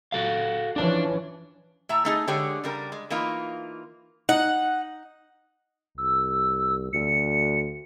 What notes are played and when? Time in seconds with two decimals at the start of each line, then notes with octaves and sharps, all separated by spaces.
0.12 F#4 A4 F5
0.76 E3 F3 C#4 D4 A5
1.89 A2 E5 A#5
2.05 A3 D#4 G#4
2.28 D3 G#3 G4 G#4 C#5 D5
2.64 C#3 G3 A#4
2.92 G#3
3.10 E3 A#3 D#4 F4
4.29 D#4 F#5
5.98 C2 E6
6.93 D2 C#7